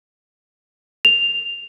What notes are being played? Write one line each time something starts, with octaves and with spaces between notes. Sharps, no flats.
F7